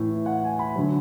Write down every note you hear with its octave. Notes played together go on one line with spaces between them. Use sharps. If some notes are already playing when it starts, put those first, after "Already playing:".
Already playing: A2 E3
F#5
G#5
B5
D3 F#3